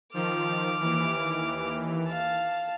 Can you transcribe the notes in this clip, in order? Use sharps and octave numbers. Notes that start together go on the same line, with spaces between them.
D#3 F3 D6 F6
D#2 E3
F5 A5